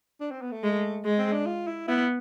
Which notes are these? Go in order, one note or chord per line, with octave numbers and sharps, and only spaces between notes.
D4
C4
B3
A3
G#3
G#3
C4
D4
F4
E4
B3 E4